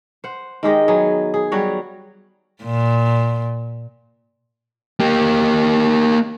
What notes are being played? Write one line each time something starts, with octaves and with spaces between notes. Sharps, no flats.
C5 F#5
D#3 G#3 G4 D#5
F#3 B3 G#4
G#4
F#3 G3 F#4 C#5
A#2
A#3 G4